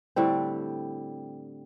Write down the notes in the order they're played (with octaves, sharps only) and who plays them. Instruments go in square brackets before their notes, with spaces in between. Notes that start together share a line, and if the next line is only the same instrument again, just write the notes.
[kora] A2 D3 G3 C4